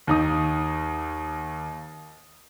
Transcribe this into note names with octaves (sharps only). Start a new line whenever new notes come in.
D#2 D#4 D#6